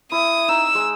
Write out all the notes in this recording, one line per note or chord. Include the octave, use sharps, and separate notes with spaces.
E4 D#6
D#4 E6
G#3